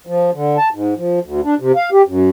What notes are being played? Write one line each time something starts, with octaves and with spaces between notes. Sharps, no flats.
F3
D3
A5
G#2
F3
D2
D4
C3
F5
G4
F#2